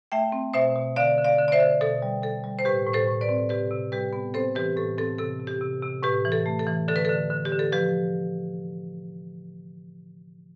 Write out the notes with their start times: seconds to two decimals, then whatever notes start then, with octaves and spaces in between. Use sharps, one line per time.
0.12 A3 E5 G5
0.32 C4
0.54 B2 C5 E5
0.76 B2
0.96 D3 D5 F5
1.18 D3
1.24 D5 F5
1.38 D3
1.48 D5
1.52 C5 E5
1.60 D3
1.81 B2 A4
2.02 G3
2.22 B2 A4
2.44 G3
2.59 C5
2.65 A2 G4 B4
2.86 A2
2.93 A4 C5
3.08 A2
3.21 B4 D5
3.29 C4
3.49 C3 G4 B4
3.71 C3
3.92 G3 G4 B4
4.13 B3
4.34 C4 A4 C5
4.55 E3 G4 B4
4.76 A2 A4
4.98 C4 A4
5.19 C3 A4
5.40 C3
5.47 G4
5.61 C3
5.82 C3
6.03 A2 G4 B4
6.25 E3
6.32 A4
6.46 A3
6.59 A4
6.67 E3
6.88 D3 A4
6.96 B4
7.05 D3 A4
7.30 D3
7.45 G4
7.52 D3
7.59 A4
7.72 F3 G4 B4